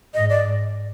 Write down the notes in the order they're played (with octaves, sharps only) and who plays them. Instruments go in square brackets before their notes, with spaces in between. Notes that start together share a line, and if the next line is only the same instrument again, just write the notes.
[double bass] G#2 [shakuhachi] D#5
[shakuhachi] D5